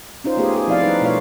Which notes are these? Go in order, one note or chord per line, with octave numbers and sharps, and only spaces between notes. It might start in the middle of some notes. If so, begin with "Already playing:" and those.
C#4 D#4 F4 C5
A3 B3 F4 G4 G#4
G#4
F3 C4 E4 D5 F5
G3 D#4 B4
B2 A3 F4 C#5 F5